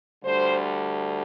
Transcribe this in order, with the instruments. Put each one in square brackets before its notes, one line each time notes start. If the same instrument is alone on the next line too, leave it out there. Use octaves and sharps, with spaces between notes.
[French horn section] D2 D3 G3 C5